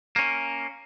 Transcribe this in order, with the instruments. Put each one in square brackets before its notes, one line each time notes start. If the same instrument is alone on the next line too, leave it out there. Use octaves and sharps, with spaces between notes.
[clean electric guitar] A#3 C#4